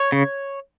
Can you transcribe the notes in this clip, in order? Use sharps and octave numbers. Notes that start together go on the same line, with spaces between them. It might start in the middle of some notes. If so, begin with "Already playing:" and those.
Already playing: C#5
C#3